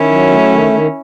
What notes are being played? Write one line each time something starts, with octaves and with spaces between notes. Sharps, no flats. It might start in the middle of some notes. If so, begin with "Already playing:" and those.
Already playing: D#3 C#4 E4
F#3
A3
D#3
D#3